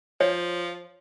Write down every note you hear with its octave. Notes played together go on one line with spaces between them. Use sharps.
F3 C#5